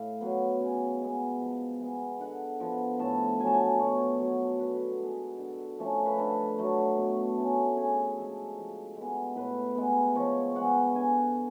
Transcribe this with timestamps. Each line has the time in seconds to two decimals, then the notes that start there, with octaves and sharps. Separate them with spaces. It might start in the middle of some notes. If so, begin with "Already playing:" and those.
Already playing: A2 F5
0.21 F#3 B3
0.60 C#3
1.01 G#3 B3
1.41 F3
1.81 G#3 B3
2.20 D3 F#5
2.60 F3 B3
2.99 A2 A5
3.40 F#3 A3 G#5
3.47 A5
3.54 G#5
3.79 B2 C#5
4.19 F#3 B3
4.58 D3 B4
4.99 G#3 B3
5.38 D3
5.79 F3 A3 C#4
6.06 B4
6.18 D3 A4
6.58 F#3 A3
6.97 B2
7.37 A3 C#4
7.77 C#3 G#4
8.17 F3 G#3 A4
8.57 F3
8.97 G#3 B3
9.36 A2 B4
9.76 G#3 B3
10.15 F3 C#5
10.55 G#3 B3 F#5
10.95 D3 G#5